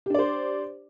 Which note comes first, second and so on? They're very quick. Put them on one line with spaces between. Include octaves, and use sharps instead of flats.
G4 D4 D5 C5